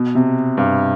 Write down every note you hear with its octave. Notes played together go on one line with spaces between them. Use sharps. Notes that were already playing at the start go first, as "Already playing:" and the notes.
Already playing: B2
C3
G2